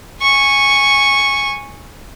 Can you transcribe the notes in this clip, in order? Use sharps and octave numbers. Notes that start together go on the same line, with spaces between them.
G#5 C#6